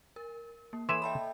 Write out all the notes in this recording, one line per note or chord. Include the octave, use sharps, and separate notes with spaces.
A#4
A#3
E3 E4 A4 C#5 G#5 C6 E7
A4 D#5 E5 G5 A5 B5